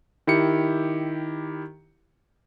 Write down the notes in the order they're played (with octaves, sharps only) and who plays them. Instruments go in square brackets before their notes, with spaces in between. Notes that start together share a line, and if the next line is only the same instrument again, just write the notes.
[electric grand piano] D#3 E4 G4 C#7